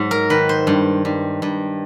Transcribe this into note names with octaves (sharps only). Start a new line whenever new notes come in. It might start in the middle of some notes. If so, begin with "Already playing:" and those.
Already playing: G#2 F#3
A#4
D#3 B4
C5
G2
G2
G2